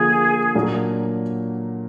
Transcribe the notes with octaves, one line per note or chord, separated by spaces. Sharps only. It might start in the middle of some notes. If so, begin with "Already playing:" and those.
Already playing: D3 F3 A#3 G#4
A#2 F#3 A#3 D4